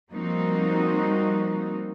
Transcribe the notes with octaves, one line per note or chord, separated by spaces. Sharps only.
F3 G3 A#3 C4 D#4 F#4